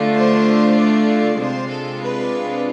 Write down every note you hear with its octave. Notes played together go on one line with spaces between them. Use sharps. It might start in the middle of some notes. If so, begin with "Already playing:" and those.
Already playing: D3 A3 D4 F4
C5
D5
C3 G#3 D4 F4 C5
A4
B4